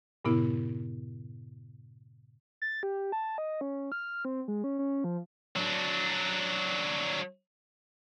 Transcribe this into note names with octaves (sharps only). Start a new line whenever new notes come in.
G2 A#2 C#3 B3 E4
A6
G4
A5
D#5
C#4
F6
C4
G#3
C#4
C#4
F3
F#3 D4